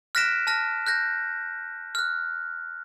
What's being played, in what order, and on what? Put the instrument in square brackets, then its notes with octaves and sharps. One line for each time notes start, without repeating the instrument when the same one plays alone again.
[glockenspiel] F6 F#6 A#6 B6 D7 E7
A5 F6 A#6
F#6 G6 A#6
F6 F#6